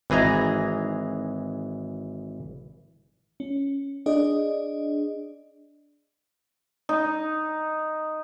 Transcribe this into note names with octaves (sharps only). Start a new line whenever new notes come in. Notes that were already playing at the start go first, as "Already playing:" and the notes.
G#1 E3 G#4 D#5 A#5
C#4
D4 G#4 D5 D#5
D#4